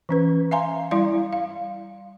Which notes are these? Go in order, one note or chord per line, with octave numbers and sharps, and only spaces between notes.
E3 C#4 B4
E5 F5 G#5 A#5 C6
G3 E4 D5 F5 C6
F5